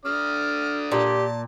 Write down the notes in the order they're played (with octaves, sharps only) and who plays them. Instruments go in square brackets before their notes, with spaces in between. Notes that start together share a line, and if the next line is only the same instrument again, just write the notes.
[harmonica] D3 D5 D#6 [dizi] F6
[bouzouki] A#2 [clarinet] G4 [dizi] A5